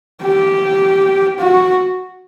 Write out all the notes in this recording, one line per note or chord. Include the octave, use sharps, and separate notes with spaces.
G4
F#4